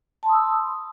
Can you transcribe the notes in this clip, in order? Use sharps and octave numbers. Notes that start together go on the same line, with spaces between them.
A5 B5 C6 D#6 E6